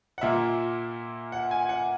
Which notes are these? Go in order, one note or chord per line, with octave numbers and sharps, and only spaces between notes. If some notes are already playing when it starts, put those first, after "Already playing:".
F#5
A#2 A#3 E5
F#5
G#5
F#5